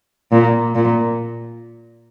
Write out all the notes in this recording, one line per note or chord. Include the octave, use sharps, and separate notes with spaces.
A#2
A#2